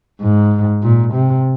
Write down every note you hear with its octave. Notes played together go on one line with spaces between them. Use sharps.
G#2
A#2
C3